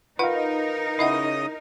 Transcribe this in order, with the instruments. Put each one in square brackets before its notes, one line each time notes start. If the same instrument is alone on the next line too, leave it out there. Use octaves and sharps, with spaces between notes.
[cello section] D#4 A#4 [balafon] F4 F#5 [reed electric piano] B4 F5
[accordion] C#3 D#5 D#6 [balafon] E4 E5 F#5